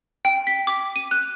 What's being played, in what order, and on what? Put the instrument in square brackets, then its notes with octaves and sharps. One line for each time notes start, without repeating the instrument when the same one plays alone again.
[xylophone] G5
B6
D6
D#7
F#6